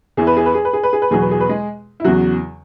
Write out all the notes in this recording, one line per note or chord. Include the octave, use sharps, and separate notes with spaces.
E2 E3 G#4
B4
G#4
B4
G#4
B4
G#4
B4
G#4
B4
E2 B2 F#3 G#4
B4
G#4
B4
G#3 G#4
E4
E2 C#3 F#3 F#4